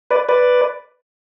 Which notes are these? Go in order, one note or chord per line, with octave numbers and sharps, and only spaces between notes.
B4 D5
B4 D5